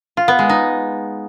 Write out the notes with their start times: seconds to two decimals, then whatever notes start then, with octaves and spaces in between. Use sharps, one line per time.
0.17 F4
0.28 B3
0.39 G#3
0.49 D#4